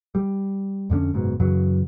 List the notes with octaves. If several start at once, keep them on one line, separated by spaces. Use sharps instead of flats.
G3
F2 D3 A#3 C#4
F#1 G#2 B2
F#2 C#3 E3 F#3